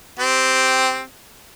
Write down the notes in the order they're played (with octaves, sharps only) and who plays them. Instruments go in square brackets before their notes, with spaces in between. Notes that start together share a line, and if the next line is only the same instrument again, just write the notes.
[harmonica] C4 G4